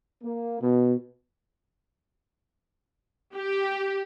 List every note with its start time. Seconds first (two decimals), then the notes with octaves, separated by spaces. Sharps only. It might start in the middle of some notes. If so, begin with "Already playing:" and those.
0.24 A#3
0.61 B2
3.35 G4